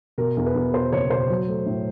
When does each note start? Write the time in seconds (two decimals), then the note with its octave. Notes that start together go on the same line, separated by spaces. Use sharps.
0.18 B2 A#4
0.37 E2
0.46 B4
0.55 E2
0.73 B2 C5
0.92 F#1 C#5
1.10 B2 C5
1.29 F#3
1.48 A3
1.66 A2